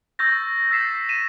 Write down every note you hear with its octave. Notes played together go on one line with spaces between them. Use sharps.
C#6 E6 G6 A6 A#6
E6 G6 A6 B6 C7 E7
B6 D#7 E7